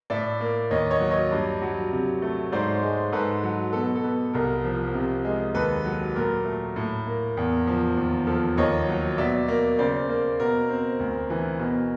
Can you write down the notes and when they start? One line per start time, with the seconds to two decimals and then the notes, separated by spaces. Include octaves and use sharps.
0.10 A2 D5 E5
0.40 A#3
0.71 D#2 C#5 D#5
0.90 C#5 D#5
1.00 F#3
1.11 C#5 D#5
1.31 G2
1.62 F#3
1.92 C3
2.22 A3
2.52 G#2 C5 D5
2.82 G#3
3.12 G#2 A4 B4
3.43 F#3
3.73 B2 A4
3.95 A4
4.04 B3
4.33 C2 A#4
4.64 F3
4.94 C3
5.24 G#3
5.54 D#2 A4 B4
5.85 F#3
6.16 A#2 A#4
6.45 A3
6.76 A2
7.07 A#3
7.37 E2
7.67 F3
7.97 D#2
8.27 F3 A4
8.57 D#2 C#5 D#5
8.88 F#3
9.18 B2 D5 E5
9.48 A#3
9.78 C#3 C5 D5
10.09 A#3
10.39 B2 A#4
10.69 C4
11.00 D2
11.30 E3
11.59 B2